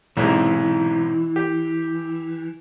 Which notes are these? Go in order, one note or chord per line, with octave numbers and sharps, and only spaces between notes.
B1 G#2 C3 E3
G4